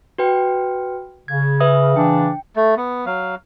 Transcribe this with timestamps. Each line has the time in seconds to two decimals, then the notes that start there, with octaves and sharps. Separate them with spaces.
0.18 F#4 B4 G5
1.28 C#3 G#6
1.60 B4 E5 D#6
1.96 C#3 E3 D4 G5
2.56 A3
2.77 B3
3.06 F#3 F5